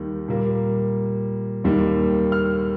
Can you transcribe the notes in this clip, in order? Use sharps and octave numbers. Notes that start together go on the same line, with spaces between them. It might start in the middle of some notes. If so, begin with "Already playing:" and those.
Already playing: D#2 D#3 G3
A#2 G3 A#3
D#2 D#3 G3 A#3
F6